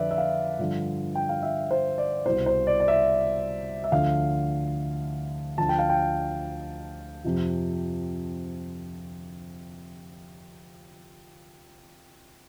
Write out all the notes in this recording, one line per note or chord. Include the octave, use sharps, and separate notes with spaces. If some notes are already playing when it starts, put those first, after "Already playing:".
Already playing: F2 D3 F3 B4 D5 E5
E5
F5
G2 D3 F3
G5
F5
E5
C5
D5
C2 B2 C5
C5
D5
D5
E5
E5
D2 D3 F3 F5
D2 D3 F3 A5
G5
F5
G5
F2 C3 F3